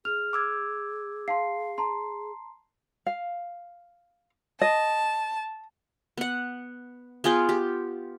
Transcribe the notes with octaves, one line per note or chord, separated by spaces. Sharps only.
G#4 F6 F7
D6 E6 G#6
F5 A5 C6 C7
A5 A#5 C6
F5
D#5 A5
B3 F#5
B3 F4 G#4 G5
G4